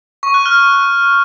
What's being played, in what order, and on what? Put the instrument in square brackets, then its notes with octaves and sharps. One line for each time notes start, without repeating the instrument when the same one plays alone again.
[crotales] C#6
F#6
F6